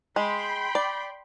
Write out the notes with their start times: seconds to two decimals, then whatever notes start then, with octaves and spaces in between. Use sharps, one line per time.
0.16 G#3 G5 B5 C6
0.75 D5